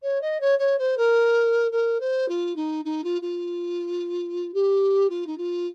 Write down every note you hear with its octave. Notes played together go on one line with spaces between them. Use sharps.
C#5
D#5
C#5
C#5
C5
A#4
A#4
C5
F4
D#4
D#4
F4
F4
G4
F4
D#4
F4